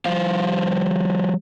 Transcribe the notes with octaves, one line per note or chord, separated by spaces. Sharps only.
F3 G3 C5 F5